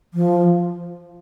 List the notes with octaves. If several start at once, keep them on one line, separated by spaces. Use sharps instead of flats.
F3